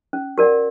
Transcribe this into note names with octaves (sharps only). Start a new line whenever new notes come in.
C#4
F#4 A#4 D5 F#5